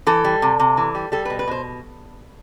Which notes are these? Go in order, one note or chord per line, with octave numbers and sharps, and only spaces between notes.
E3 A4
G3
C3
C3
E3
G3
G3 A4
B4
B2
B4
B2 C5